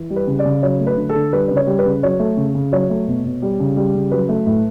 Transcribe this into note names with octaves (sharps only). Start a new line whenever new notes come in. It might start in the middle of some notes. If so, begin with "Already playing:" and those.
Already playing: E3
G3
B4
C#3
D5
C#3
F#3 C#5
A3
B4
D3
A4
D3
G3 B4
C#3 B4
C#5
G3
B4
C#3
F#3 C#5
A3
C#3
C#3
F#3 C#5
A3
B2
B2
G3
C#3
G3
C#3
F#3 B4
A3
A2